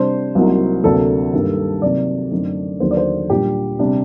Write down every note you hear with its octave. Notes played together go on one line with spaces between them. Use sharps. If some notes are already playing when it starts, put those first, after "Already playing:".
Already playing: C3 G3 D4 C5
C2 C3 F#3 A#3 D#4
D2 C3 F#3 A#3 D4 A4
G2 D#3 G3 A#3
C3 F#3 A#3 D#4 D5
F#2 D3 A3 C4 D#4
D#2 D3 F#3 A#3 C5
D5
C5
A#2 G3 D4 G4
C3 G3 D4